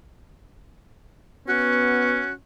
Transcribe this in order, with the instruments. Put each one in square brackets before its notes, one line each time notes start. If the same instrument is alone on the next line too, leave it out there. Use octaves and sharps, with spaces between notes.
[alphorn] B3 [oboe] C#4 [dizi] F#4